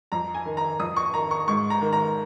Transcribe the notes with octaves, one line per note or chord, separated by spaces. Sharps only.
F2 A#5
G#5
D#3
A#5
F2 D#6
C#6
D#3 A#5
C#6
G#2 C#6
A#5
D#3
A#5